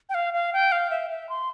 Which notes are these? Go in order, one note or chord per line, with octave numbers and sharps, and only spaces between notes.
G5
F5
F5
G5
F5
E5
E5
C6